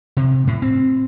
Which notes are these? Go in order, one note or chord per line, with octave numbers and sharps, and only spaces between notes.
C3
A2
C4